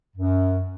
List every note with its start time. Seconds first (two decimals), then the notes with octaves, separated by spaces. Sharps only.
0.17 F#2